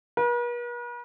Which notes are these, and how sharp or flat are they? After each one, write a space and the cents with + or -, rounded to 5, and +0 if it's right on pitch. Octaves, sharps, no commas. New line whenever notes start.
B4 -45